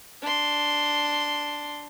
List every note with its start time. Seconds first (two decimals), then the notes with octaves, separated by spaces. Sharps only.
0.22 D4 C6